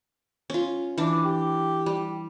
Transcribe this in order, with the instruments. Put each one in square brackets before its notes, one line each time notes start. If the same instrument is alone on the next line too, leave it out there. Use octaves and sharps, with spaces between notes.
[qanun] C#4 F4
E3 D4
[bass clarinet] G4
[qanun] G3